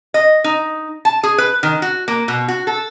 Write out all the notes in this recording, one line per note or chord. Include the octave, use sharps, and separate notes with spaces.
D#5
D#4
A5
G#4
B4
D#3
F#4
A#3
B2
F#4
A4